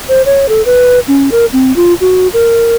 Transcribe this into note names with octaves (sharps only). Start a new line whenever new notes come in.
C5
C#5
A4
B4
C#4
A#4
C4
F4
F#4
A#4